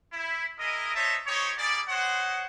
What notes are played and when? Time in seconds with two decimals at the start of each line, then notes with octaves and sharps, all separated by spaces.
0.13 E4
0.58 E4 G#4 A#4 D#5
0.95 D#4 C5 C#5 D#5 E5 A5
1.26 D#4 G4 C5 C#5
1.58 G3 A#3 G#4 D5
1.89 C5 C#5 D#5 F#5